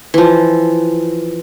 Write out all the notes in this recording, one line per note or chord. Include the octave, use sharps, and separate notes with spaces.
E3 F3